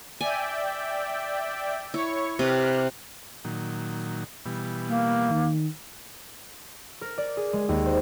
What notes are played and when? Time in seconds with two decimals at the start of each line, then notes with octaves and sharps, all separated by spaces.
0.21 D5 E5 G5 G#5
1.94 E4 C#5 C#6
2.39 C3 G4 B4 F6 F#6
3.45 A#2 D#3 F#3
4.45 B2 E3 G3
4.88 A#3
5.30 D#3
7.01 A#4
7.18 D5
7.37 G#4
7.53 G#3
7.69 D#2
7.86 C5